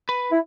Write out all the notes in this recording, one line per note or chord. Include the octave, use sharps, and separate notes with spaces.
B4
E4